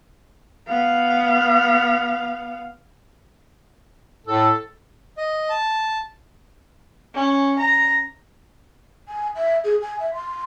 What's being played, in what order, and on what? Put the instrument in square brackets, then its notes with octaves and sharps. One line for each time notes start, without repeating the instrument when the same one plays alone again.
[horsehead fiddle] B3 F5
[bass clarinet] A2 [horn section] A4
[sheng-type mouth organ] D#5
A5
[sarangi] C#4
A#5
[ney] G#5
E5
G#4
G#5
E5
C6